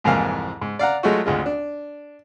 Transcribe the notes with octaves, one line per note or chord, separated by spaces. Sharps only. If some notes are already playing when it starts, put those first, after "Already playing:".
C2 F2 G#2 E3 A#3 F5
G#2
D5 F5 F#5 A#5
F#3 G#3 A3 F4 F#4
G#1 D2 G#3 F4
D4